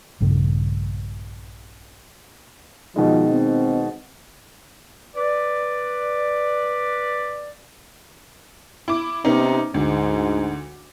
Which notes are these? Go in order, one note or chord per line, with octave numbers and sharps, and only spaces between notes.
A#1 G2 C#3 A3
B2 D#3 F3 G#3
C4
B4 D5
E4 D6
C3 B3 C#4 D#4
D2 G#2